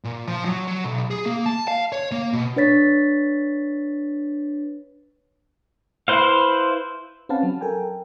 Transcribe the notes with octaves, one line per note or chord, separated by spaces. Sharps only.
A#2
F3
F#3
F#3
B1
G#4
A#3
A5
F5
C#5
A#3
B2
D4 B4 C#5 A6 B6
E4 B4 C5 F5
C4 C#4 B4 F5 F#5 A5
F#3
A4 A#4 G5 G#5